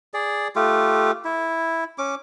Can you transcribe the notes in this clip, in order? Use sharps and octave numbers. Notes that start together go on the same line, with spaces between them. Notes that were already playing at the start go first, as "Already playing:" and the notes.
G#4 D5
A3 F4 G4
E4
C#4 D6